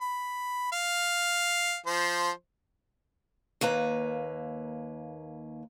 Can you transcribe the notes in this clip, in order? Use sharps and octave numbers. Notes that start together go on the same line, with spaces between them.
B5
F5
F3 C5
D#2 A#3 B4 A#5